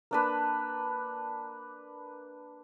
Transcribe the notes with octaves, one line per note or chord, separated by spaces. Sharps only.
A#3 D4 B4